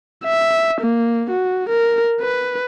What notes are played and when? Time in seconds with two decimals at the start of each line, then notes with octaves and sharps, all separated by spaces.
0.24 E5
0.81 A#3
1.31 F#4
1.69 A#4
2.21 B4